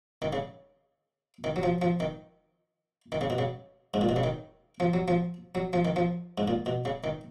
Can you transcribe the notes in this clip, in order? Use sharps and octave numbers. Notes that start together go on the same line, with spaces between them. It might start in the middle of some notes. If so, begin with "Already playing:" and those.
D#3
C#3
D#3
F#3
F3
F3
D#3
D#3
C#3
B2
C#3
G#2
A#2
B2
C#3
D#3
F3
F#3
F3
F#3
F3
D#3
F3
G#2
A#2
B2
C#3
D#3